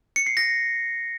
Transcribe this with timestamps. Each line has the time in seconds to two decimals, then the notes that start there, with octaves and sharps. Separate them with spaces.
0.16 C#7
0.26 C7
0.37 A#6